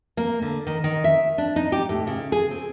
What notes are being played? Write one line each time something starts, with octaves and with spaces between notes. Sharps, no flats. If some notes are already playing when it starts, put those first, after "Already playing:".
A#3
D3
D#3
D#3
E5
D4
D#4
G4
A2
C#3
G#4
C4